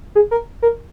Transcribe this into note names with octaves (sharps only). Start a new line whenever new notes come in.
G#4
A#4
A#4